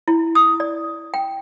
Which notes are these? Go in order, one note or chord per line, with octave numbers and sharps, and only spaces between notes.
E4
D#6
D5
G5